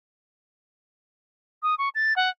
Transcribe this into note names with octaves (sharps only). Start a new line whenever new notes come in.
D#6
C#6
A6
F#5